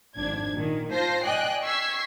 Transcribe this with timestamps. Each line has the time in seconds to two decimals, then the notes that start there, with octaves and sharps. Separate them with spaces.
0.16 G#1 F2 G#2 D4 G#6
0.55 A#2 D#3
0.92 F4 C5 A5 G6 A#6 C7
1.24 D5 D#5 G5 G#5 F#6
1.63 C#6 E6 G#6 B6 C7